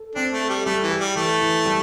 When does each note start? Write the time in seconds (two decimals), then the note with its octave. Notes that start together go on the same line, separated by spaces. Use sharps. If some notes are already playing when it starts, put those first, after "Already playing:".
Already playing: A4
0.15 C4 D4
0.33 A3
0.41 A4
0.49 G3
0.66 G3 A3
0.83 E3
0.91 G4
1.00 G3
1.15 E3 A3
1.41 E3
1.66 G3